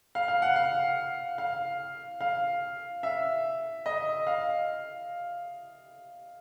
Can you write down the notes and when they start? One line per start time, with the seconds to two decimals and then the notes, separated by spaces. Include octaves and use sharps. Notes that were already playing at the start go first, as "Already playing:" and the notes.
0.15 F5
0.28 F5
0.42 F#5
0.56 F5
1.38 F5
2.21 F5
3.03 E5
3.86 D#5
4.27 F5